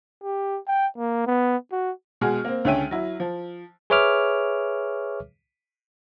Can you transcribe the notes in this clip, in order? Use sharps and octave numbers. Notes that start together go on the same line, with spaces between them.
G4
G5
A#3
B3
F#4
B2 G#3 F#4 G#4 F6
A#3 C4
C#2 D3 C#4 E5 G5 D#7
F#3 E4
F3
G#4 B4 C#5 E5 D6 F6